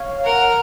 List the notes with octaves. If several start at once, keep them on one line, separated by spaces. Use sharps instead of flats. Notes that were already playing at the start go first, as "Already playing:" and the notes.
Already playing: C#5 F5
A#4 F#5